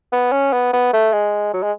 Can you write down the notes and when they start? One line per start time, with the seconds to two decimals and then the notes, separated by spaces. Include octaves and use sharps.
0.13 B3
0.32 C#4
0.53 B3
0.73 B3
0.94 A3
1.13 G#3
1.54 F#3
1.63 G#3